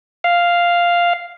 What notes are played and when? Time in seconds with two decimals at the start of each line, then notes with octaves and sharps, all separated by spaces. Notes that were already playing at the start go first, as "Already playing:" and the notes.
0.24 F5